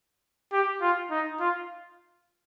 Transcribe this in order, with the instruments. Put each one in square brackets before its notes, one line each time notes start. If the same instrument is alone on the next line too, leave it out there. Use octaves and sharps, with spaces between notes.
[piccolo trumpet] G4
F4
D#4
F4